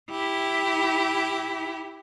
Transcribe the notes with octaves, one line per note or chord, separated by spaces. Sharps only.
E4 G4